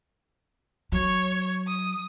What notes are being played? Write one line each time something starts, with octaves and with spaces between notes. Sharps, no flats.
F#3 C#5
D#6